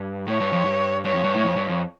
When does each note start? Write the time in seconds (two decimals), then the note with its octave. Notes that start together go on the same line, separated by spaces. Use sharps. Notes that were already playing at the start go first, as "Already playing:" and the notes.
Already playing: G2
0.28 A2 C#5
0.40 G2
0.52 F2
0.65 G2
1.05 G2 C#5
1.14 F2
1.24 G2
1.34 A2
1.43 F2
1.56 G2
1.69 F2